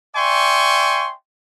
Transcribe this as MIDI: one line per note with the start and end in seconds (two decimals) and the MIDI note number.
0.16 1.13 74
0.16 1.13 76
0.16 1.13 79
0.16 1.13 80
0.16 1.13 84
0.16 1.13 85